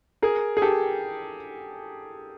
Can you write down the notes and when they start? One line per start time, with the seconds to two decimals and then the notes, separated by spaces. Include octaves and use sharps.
0.22 G#4 A#4
0.57 G#4
0.62 G4 A4